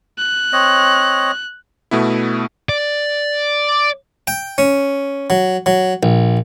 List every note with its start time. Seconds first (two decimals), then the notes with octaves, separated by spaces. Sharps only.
0.18 F#6
0.53 C4 C#5 D#5
1.91 B2 A3 B3 E4
2.69 D5
4.27 G5
4.58 C#4
5.30 F#3
5.66 F#3
6.03 A#1